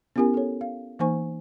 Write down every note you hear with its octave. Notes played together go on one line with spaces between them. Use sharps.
B3 C#4 E4 G4 A#4 G#5
A4 C#5
F5
E3 A#3 D#4 C5 G#5 C#6